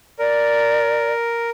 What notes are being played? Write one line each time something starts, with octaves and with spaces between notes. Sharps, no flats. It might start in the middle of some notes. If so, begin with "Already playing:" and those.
A#4 D5